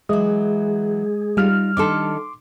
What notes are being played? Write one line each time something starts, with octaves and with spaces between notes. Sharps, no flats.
E3 F#3 G#3 G#4
G3 D#4 F4 F6
D#3 D4 A4 C6 D6